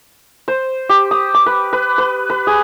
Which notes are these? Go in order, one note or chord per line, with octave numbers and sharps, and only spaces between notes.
C5
G4
D#6
D6
B4
B4
B4
B4
G#4